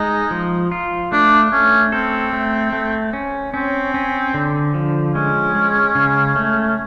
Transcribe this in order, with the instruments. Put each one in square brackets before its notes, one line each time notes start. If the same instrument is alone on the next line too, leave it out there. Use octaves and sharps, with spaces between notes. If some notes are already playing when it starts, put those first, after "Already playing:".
Already playing: [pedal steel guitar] G#3 [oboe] D#4
[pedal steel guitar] F3
F4
[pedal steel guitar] A3 [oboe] D4
[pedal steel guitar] A3 [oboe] C#4
[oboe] C4 [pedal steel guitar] A4
[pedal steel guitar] A3
A3
C#4
[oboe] C4 [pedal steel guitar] C#4
[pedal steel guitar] C#4
D3
F3
[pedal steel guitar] G#3 [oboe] C#4
[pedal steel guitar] G#3
C#3
A3